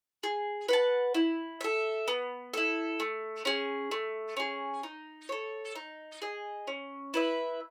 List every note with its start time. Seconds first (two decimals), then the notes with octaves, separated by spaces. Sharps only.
0.23 G#4
0.69 B4 F#5 A5
1.14 E4
1.61 A4 E5
2.08 B3
2.54 E4 A4
3.00 A3
3.45 C#4 G#4
3.91 A3
4.37 C#4 G#4
4.83 D#4
5.29 A4 C#5
5.75 D#4
6.22 G#4 D#5
6.67 C#4
7.14 E4 B4 E5